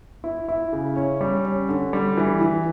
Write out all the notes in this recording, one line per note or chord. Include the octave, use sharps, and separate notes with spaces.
E4
E4
C#3
C#4
G3
C#4
D3
G3
E3
E3